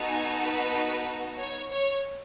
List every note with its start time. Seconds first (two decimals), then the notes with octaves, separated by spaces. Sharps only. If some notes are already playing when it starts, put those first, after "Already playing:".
Already playing: B3 D#4 F#4 A4
0.08 G#5
0.41 B4
1.39 C#5
1.71 C#5